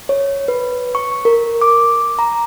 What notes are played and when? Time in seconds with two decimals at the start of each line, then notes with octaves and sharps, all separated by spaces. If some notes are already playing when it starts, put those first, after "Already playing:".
0.09 C#5
0.48 B4
0.95 C#6
1.25 A#4
1.62 D6
2.19 A#5